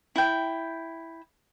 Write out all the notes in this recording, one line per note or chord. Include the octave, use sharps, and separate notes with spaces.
E4 G5